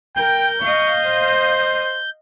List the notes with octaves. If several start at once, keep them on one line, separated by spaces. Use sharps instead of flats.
A#4 G5 G6
D#5 F5 C#6
C5